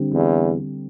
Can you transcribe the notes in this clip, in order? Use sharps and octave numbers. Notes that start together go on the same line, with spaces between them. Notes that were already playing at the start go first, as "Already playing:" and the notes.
Already playing: D3 G3 C4
E2